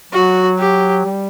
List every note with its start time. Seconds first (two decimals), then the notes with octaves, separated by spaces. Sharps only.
0.13 F#3 F#4
0.59 G4
1.05 G3